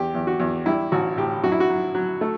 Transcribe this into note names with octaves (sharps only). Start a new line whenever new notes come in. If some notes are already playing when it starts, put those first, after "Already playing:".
Already playing: E2 G4
E2
F#4
E2
G3 E4
A1 F#4
A2 G4
F#2 F#4
E4
F#4
F#3
F#3
A3